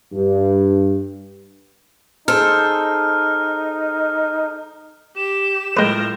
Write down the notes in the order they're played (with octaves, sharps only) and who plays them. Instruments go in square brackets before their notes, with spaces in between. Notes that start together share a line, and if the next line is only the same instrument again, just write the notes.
[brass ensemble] G2
[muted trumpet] D#4 [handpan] G#4 C5 [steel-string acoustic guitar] A4 [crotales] F6
[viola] G4 [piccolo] E7
[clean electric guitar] A2 G5 [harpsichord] G#3 B4 [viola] F4 A#4